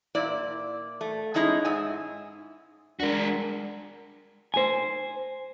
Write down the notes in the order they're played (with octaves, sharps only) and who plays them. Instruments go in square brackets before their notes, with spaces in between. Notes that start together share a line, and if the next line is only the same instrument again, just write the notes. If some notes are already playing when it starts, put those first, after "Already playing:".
[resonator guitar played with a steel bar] A#2 E4 D5
A3
G#3 C#4 D#4 E4 G#4
G#2 E5 G#5
[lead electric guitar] G#3 F#4 [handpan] D4 A#4
[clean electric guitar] C5 G#5